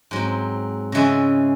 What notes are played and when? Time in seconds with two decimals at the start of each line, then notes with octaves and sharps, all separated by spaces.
0.11 G#2 F#3 C4
0.92 C#3 E3 G#3 C#4 E5